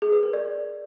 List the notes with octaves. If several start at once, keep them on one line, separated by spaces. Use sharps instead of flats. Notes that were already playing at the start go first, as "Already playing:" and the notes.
G#4
B4
A#4
D5